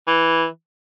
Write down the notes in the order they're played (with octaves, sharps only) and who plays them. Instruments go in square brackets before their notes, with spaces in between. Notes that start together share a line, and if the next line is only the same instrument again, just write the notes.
[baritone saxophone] E3